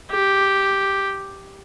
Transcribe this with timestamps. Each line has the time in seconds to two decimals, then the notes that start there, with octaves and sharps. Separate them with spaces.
0.11 G4